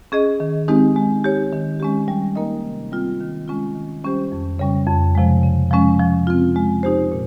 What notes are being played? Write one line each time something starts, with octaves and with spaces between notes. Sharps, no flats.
C#4 G#4 D#5
D#3
G#3 C4 D#4 G4
G#3
D#4 G4 C#5
D#3
G#3 C#4 G4
G3
A#3 D#4 A#4 D#5
C3
G3 C4 F4
D#3
G#3 C#4 F4
D#3
G3 C#4 G4 C5
F2
C#3 G3 C#4
F2
C3 F3 G#3
C#3
F3 G#3 C#4
F3
C4 F4
G#3
D#4 G4 C5
A#2